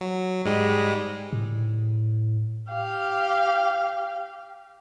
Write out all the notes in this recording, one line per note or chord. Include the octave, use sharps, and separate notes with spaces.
F#3
G#2 G3 G#3
A2
G4 F5